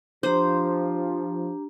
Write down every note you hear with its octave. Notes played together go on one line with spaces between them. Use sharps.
F3 D4 G4 C5 A#5